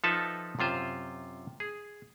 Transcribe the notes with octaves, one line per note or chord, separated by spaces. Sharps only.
F3 D#4 A4 B4 E5 A5
F#2 C3 F4 C5
G#4